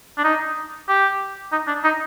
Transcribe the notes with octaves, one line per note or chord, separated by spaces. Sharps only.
D4
D#4
G4
D#4
D4
D#4